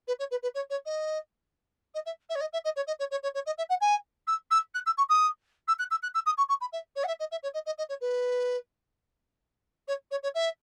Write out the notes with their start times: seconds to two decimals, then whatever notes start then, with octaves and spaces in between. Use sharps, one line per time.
0.07 B4
0.19 C#5
0.31 B4
0.42 B4
0.54 C#5
0.70 C#5
0.85 D#5
1.94 D#5
2.05 E5
2.29 E5
2.35 C#5
2.40 D#5
2.53 E5
2.64 D#5
2.76 C#5
2.87 D#5
2.99 C#5
3.11 C#5
3.23 C#5
3.34 C#5
3.46 D#5
3.57 E5
3.69 F#5
3.81 G#5
4.27 E6
4.51 E6
4.74 F#6
4.86 E6
4.97 C#6
5.09 D#6
5.67 E6
5.79 F#6
5.90 E6
6.02 F#6
6.14 E6
6.26 D#6
6.37 C#6
6.49 C#6
6.60 B5
6.72 E5
6.95 C#5
7.03 F#5
7.07 E5
7.19 D#5
7.31 E5
7.43 C#5
7.54 D#5
7.65 D#5
7.78 D#5
7.89 C#5
8.01 B4
9.87 C#5
10.11 C#5
10.23 C#5
10.34 E5